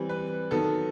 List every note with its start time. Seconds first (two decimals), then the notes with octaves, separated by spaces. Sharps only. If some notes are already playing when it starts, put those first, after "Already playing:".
Already playing: E3 G3 C4
0.09 B4
0.51 D#3 F#3 B3 A4